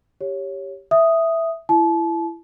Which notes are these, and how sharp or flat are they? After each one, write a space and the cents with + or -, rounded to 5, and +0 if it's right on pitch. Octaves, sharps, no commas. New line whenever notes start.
G4 +0 C#5 +0
E5 +0 D#6 +0
E4 +20 A5 -35